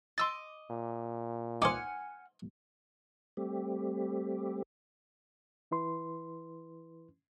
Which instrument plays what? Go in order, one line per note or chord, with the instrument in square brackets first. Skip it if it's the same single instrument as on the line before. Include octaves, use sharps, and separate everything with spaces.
[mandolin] D#5 D6 [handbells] C6 E6 A6
[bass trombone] A#2
[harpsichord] D#4 C5 [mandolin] F#5 G#5 F6 [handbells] D6
[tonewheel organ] G3 A3 C4 G4
[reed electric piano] E3 E4 B4 C6